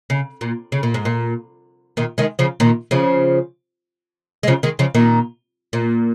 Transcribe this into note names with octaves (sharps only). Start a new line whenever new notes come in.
C#3
A#2
C#3
A#2
G#2
A#2
A#2 D#3
D#3 G#3
C#3 F3
A#2 D#3
C#3 F3
G#3
C#3 F3
D#3 G#3
C#3 F3
A#2 D#3
A#2